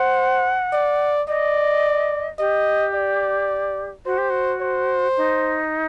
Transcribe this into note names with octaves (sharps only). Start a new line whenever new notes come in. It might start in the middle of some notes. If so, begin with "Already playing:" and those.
Already playing: C5 F#5
D5
D5 D#5
G4 D#5
D5
F#4 C5
G4
F#4
C5
D#4